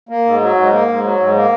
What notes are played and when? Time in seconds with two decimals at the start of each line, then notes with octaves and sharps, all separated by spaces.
0.09 A#3
0.25 G#2
0.41 F#3
0.56 G#2
0.72 A#3
0.88 G#2
1.04 F#3
1.20 G#2
1.35 A#3